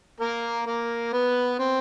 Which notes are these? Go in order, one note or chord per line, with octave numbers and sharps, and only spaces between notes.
A#3 A#4
A#3 A#4
B3 B4
C4 C5